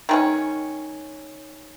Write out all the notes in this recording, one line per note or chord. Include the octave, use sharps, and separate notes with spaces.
D#3 G#3 C#4